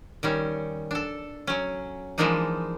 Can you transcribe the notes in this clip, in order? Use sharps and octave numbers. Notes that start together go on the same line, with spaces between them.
D#3 G3 C#4
D4 A4
F#3 C#4
E3 F3 G#3 A#3 D4 D#4